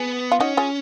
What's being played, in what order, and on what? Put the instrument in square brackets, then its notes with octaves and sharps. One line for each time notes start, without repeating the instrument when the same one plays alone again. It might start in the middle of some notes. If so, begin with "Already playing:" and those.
Already playing: [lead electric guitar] B3 [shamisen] G#4
[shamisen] F4
[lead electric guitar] C#4 [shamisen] D#4 F#4
[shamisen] F4 G#4